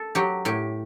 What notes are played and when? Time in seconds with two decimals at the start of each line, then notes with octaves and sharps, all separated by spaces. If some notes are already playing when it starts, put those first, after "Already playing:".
Already playing: A4
0.15 F#3 G4
0.45 A2 G4